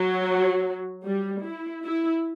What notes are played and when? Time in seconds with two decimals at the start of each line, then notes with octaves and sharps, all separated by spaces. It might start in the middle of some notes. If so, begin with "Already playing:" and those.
Already playing: F#3
1.05 G3
1.44 E4
1.83 E4